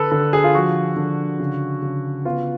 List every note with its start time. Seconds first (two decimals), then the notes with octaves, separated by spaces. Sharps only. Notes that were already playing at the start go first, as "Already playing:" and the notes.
Already playing: D3 A4 B4
0.11 D3 A4
0.33 G#4
0.44 F4
0.54 F3 F#4
0.96 D3
1.40 C#3
1.82 C#3
2.25 B3 F4